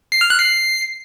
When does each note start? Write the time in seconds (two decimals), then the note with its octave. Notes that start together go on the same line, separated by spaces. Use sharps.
0.12 C7
0.21 F6
0.30 F#6
0.39 C7